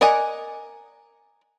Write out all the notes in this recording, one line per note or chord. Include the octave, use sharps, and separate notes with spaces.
A#4 D5 D#5 F#5 G#5